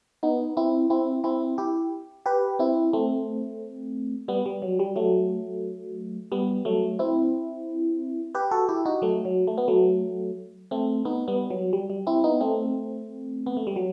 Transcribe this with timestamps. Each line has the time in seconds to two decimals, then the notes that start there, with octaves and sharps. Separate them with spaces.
0.23 B3 D#4
0.57 C4 E4
0.90 C4 E4
1.24 C4 E4
1.58 E4 G4
2.26 G4 B4
2.59 C4 E4
2.93 A3 C4
4.28 G3 B3
4.46 G3
4.62 F#3
4.79 G3
4.96 F#3 A3
6.32 G3 B3
6.65 F#3 A3
6.99 C4 E4
8.35 G4 B4
8.51 F#4 A4
8.69 E4 G4
8.85 D#4 F#4
9.02 F#3 A3
9.25 F#3
9.47 A3
9.58 B3
9.68 F#3 A3
10.71 A3 C4
11.05 B3 D#4
11.28 G3 B3
11.50 F#3
11.73 G3
11.90 G3
12.07 C4 E4
12.24 B3 D#4
12.41 A3 C4
13.46 B3
13.57 A3
13.67 G3
13.76 F#3